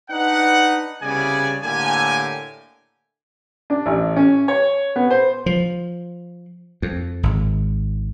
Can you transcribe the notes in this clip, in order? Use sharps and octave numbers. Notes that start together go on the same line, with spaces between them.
D4 D#4 B4 F#5
C2 C#3 G3 B3 D5 G#5
A2 D3 A#3 G4 G#5
D4
A1
C#4
C#5
B3
C5
F3
F2
G#1